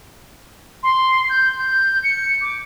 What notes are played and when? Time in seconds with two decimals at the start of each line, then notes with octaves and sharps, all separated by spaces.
0.83 C6
1.29 G6
1.59 G6
2.04 C#7
2.41 D6